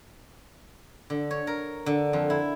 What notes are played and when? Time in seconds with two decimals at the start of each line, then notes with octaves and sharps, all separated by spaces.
1.10 D3
1.31 C#5
1.47 A#4
1.86 D3
2.13 F2
2.30 E4